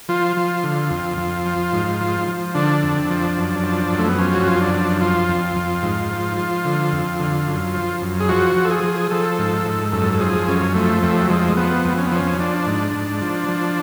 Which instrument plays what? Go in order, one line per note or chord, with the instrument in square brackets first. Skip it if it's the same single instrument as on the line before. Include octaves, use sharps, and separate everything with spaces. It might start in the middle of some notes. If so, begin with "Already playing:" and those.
[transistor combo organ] F3 F4
F3
D3
F2
F2
F3
G#2
F3
F3
D3 D4
F2
F3
F#2
F3
F#2
A3
B3
F3 C#4
F#4
F#2 F4
D4
F3
F3 F4
F2
F2
G#2
F3
F3
D3
F2
D3
F#2
F3
F#2
G#4
F3 F#4
F3
A4
G#4
F3
F3 A4
G#2
G#2
F#2 A4
A4
F3 G#4
F#2 C#4
F3 A3
F2 A3
F#3
F3 G#3
F3 B3
F2
C#4
B3
F3 C#4
F3 D4
G#2
G#2
F3
F3